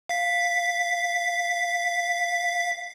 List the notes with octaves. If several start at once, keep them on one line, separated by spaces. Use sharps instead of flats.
F5 B6